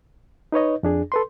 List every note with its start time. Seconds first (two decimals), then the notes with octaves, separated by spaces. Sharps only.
0.52 D#4 B4 C#5 D#5
0.83 F2 D4 G#4
1.12 A4 B4 C6